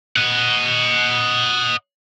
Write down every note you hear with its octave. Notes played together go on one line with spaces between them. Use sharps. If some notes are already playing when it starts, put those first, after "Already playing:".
D#5 F#5